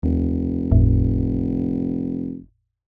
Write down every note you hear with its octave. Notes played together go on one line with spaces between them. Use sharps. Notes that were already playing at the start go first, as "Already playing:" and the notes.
F1 D#2
G1 E2 A2